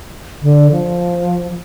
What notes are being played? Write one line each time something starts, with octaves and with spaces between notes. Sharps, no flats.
D3
F3